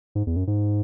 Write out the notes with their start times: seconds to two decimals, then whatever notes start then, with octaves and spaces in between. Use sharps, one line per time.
0.15 G#2
0.27 E2
0.36 F#2
0.47 G#2